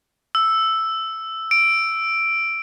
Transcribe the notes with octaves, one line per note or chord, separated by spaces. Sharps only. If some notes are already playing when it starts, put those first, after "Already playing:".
E6
D7